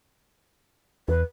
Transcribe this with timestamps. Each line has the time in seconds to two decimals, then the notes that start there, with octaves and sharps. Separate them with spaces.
1.08 E2 B4